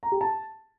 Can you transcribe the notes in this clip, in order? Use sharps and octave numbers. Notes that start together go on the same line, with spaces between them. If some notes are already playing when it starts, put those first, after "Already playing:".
A#5
G4
A5